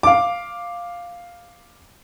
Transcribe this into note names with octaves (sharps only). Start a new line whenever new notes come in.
F5 D6